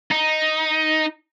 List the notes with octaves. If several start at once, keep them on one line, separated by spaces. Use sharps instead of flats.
D#4